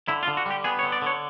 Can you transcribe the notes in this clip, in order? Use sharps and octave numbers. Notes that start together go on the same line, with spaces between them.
D3 E4
F4
D3
F#4
G3 G4
B3 G#4
C#5
D3
D5
D3 C#5